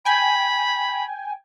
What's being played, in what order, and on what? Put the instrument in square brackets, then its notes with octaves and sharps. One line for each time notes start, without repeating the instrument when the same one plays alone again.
[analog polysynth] G5 G#5 [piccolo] B5